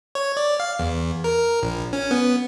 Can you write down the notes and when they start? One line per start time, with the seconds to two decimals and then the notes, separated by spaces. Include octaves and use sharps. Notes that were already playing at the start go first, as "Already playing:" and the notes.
0.15 C#5
0.37 D5
0.60 F5
0.79 E2
1.24 A#4
1.63 A#1
1.93 C#4
2.11 B3